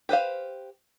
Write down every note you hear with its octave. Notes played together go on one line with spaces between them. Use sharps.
G4 B4 C5 F5